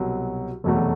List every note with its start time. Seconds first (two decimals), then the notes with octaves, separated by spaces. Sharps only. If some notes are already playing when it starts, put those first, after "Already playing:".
Already playing: C2 B2 F#3
0.64 F1 E2 B2 F#3 A3